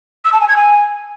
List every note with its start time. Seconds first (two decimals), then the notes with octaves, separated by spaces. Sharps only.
0.24 E6
0.32 A5
0.40 G#5
0.48 G#6
0.56 G#5